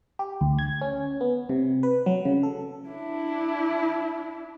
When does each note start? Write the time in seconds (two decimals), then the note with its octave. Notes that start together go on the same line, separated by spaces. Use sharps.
0.19 G4
0.41 D2
0.59 G#6
0.81 C#4
1.21 B3
1.49 C3
1.83 B4
2.06 F#3
2.25 C#3
2.43 A4
2.89 D4 E4